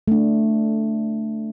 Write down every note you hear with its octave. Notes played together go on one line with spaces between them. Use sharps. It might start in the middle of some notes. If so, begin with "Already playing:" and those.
A3 D4